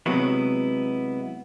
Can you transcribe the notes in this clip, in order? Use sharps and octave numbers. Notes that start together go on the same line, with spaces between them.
C3 F#3 G#3 B3 E4